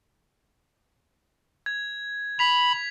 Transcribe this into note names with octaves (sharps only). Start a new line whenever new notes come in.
G#6
B5 B6 F7